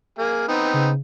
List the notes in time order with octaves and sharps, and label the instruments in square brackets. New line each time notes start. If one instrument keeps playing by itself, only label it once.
[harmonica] A#3 G#4
[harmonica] B3 C4 D#4 [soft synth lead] G5
[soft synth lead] C#3